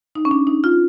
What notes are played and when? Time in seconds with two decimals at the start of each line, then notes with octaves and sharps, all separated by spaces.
0.15 D#4
0.25 C#4
0.31 D4
0.47 D#4
0.64 F4